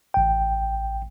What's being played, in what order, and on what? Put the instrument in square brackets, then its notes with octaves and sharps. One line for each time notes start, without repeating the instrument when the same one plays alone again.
[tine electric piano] A1 G5